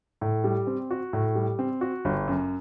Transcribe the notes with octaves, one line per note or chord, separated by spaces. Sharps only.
A2
G3
C4
F#4
A2
G3
C4
F#4
G1
F#2